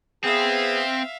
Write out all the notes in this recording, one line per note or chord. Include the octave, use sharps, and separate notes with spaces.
B3 C4 G#4 E5 F5